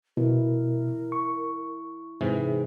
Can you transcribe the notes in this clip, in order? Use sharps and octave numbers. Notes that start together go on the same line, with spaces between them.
B2 E4 A#4
C#6
G#2 C3 E3 G#4